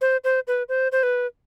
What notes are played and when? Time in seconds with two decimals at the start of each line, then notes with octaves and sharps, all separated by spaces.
0.01 C5
0.24 C5
0.47 B4
0.69 C5
0.92 C5
1.03 B4